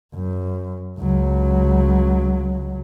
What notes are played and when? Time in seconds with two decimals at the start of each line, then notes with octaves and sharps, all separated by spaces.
0.15 F#2
0.99 C#2 F#3